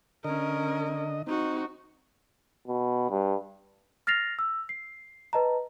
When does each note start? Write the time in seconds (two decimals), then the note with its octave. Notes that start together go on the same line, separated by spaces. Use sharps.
0.24 D3 C#4 A#4 D#5
1.27 C4 D#4 F#4
2.67 B2
3.10 G2
4.07 F6 A6 A#6 C7 F7
4.39 E6
4.69 C7
5.33 B4 D#5 A5 A#5